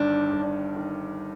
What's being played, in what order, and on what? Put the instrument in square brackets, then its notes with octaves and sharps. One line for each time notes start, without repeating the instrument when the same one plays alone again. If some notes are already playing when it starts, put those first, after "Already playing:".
Already playing: [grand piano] G1 G2 D#3 [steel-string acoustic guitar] D4
[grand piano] G1
D#3